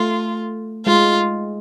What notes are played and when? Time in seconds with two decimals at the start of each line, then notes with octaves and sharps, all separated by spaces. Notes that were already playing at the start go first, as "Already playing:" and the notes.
Already playing: A3 F4
0.86 G#3 F4